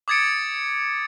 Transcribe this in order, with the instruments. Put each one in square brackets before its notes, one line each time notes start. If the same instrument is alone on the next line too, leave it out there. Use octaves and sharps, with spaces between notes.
[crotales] D6 D#6 G#6 A6 C#7 D7